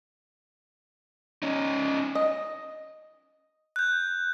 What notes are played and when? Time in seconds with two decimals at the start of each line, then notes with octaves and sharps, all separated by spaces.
1.43 C#4 D#4
2.15 D#5
3.76 F#6 G6